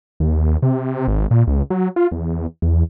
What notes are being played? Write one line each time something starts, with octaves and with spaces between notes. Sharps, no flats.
D#2
C3
G#1
A#2
C#2
F#3
F4
E2
E2